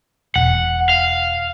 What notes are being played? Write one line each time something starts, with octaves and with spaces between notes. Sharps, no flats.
E1 F#5
F5